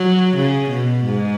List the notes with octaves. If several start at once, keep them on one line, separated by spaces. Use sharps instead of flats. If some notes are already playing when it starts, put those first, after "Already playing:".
Already playing: F#3
C#3
B2
G#2